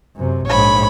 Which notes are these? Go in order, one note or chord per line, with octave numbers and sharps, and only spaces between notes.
F#2 C3
A#1 G#2 C#5 B5